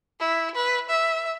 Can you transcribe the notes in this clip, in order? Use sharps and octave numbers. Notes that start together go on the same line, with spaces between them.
E4
B4
E5